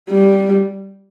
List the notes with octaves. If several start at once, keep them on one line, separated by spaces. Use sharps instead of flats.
G3